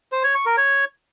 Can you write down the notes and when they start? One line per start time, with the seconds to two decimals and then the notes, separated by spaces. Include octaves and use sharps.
0.12 C5
0.23 C#5
0.35 C#6
0.46 A#4
0.57 C#5